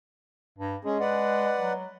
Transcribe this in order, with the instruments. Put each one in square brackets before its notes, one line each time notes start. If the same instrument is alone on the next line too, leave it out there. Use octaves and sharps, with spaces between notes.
[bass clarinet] G2
[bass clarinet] G#3 [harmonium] C#4 G#4
[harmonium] B4 D5 F#5
[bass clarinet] F#3